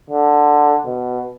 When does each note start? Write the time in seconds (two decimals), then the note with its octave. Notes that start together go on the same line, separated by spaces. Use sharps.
0.10 D3
0.87 B2